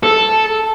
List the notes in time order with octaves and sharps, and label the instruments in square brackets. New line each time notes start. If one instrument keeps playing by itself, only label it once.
[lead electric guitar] A4